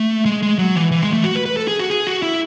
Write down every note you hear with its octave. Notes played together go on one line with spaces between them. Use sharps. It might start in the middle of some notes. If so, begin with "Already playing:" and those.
Already playing: A3
G#3
G#3
F#3
E3
E3
G#3
A3
F#4
B4
B4
A4
G#4
F#4
G#4
F#4
E4